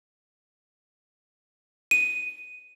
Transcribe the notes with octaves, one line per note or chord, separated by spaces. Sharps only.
D#7